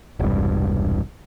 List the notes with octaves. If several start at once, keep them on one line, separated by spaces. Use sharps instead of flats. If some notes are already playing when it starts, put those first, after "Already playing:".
E1 C2 G2